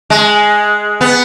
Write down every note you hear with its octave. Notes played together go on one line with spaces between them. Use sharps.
G#3
B3